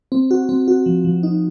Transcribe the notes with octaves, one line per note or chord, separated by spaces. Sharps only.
C4
F#4
C4
F#4
F3
F3
D#4